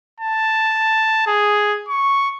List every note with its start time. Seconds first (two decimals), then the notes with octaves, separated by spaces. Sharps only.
0.20 A5
1.27 G#4
1.89 C#6